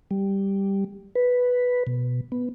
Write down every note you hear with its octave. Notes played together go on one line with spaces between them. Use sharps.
G3
B4
B2
B3